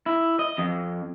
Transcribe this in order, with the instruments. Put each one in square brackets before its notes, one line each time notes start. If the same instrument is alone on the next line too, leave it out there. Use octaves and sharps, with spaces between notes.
[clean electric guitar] E4
D#5
F2